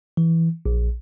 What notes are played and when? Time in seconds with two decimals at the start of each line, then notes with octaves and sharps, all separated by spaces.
0.17 E3
0.66 A#1